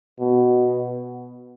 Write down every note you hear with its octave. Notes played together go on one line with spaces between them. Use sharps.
B2